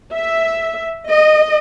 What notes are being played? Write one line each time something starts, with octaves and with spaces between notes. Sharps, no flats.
E5
D#5